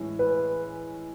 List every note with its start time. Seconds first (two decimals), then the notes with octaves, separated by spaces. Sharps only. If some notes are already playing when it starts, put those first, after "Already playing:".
Already playing: A2 E3 G#3 C#4
0.19 B4